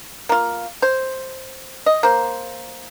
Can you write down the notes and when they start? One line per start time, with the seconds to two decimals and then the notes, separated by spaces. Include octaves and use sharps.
0.29 A#3 F4
0.82 C5
1.86 D#5
2.03 A#3 C5